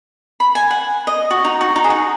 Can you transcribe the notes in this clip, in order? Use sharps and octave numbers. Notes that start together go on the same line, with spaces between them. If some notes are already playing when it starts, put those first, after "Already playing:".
B5
G#5
F#5
D#5
F#4
D#4
F#4
D#4
G#4
F#4